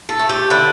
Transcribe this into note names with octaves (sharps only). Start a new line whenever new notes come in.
A4
A3
G4
D3 E4